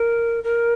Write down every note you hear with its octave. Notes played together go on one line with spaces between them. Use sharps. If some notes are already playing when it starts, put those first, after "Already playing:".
Already playing: A#4
A#4